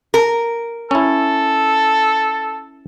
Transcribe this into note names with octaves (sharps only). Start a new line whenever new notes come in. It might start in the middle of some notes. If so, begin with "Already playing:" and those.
A#4
C#4 E4 A4